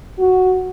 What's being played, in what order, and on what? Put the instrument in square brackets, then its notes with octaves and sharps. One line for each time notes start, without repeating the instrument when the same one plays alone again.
[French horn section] F#4